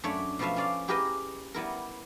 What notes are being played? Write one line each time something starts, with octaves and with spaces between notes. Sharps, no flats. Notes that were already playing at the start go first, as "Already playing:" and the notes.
F#2 A3 D4 C#5 D5 E5
B2 F3 A3 B4 E5 F5
C#4 D5 F5
E4 G4 G#4 A#4 B4 D#5
G3 B3 E4 A#4